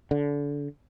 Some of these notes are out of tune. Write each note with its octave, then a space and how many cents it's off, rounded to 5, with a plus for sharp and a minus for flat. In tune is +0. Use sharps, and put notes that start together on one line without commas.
D3 -25